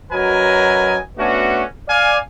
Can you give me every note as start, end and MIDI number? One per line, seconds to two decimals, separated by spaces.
0.11 0.98 42
0.11 0.98 54
0.11 0.98 70
0.11 0.98 71
0.11 0.98 75
0.11 0.98 80
1.18 1.63 57
1.18 1.63 59
1.18 1.63 61
1.18 1.63 62
1.18 1.63 66
1.89 2.18 74
1.89 2.18 77
1.89 2.18 80